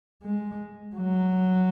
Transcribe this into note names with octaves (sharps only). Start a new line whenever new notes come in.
G#3
F#3